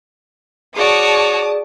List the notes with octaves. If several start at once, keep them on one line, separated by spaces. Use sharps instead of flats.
F#4 G#4 C#5 D5 A5 D6 D#6